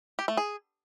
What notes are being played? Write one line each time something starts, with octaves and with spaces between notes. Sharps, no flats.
G4
A3
G#4